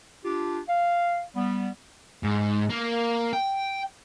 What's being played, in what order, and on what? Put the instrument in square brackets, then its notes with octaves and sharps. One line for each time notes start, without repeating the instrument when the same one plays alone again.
[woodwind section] D4 F4 G4
F5
G3 B3
[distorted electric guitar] G#2
A#3
G5